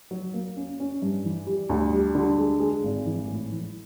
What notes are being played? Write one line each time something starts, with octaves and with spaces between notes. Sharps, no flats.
F#3
A#3
C#4
C#4
G2
E3
G3
D2
G3
D3
G#3
G#3
G#1
E3
A2
E3